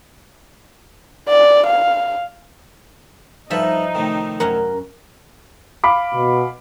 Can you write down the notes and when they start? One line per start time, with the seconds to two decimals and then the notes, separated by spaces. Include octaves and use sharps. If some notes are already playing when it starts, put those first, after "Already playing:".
1.28 D5
1.67 F5
3.51 G2 F3 D#4 A4 B4 E5
3.95 A2 C3 D#3
4.40 F#2 C#4 A#4 F#5 A#5
5.84 F5 B5 D6
6.14 B2